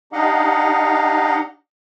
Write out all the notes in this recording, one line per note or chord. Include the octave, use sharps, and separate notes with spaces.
D4 D#4 G4 D#5 F5 F#5